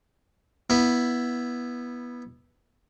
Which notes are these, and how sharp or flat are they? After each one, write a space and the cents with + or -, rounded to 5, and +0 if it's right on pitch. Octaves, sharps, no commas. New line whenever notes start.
B3 -10 E4 +0